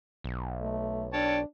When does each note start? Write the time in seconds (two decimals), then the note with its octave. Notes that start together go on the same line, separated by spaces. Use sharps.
0.24 B1
0.61 A3
1.13 D4 C#5 G5 A5